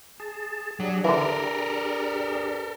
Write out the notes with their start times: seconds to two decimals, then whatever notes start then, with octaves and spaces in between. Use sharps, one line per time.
0.20 G#4 A5
0.80 F#3 D4 G4 G#4
1.04 D3 E3 A4 A#4